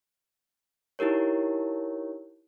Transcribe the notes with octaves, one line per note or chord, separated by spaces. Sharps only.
D#4 E4 G4 A#4 C#5